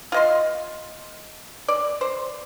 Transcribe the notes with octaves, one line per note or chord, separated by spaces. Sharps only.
F4 D#5 C6
D5
C5